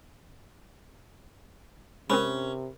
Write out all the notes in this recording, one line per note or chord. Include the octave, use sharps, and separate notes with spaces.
C3 G#3 C4 C#4 A#4 C5 B5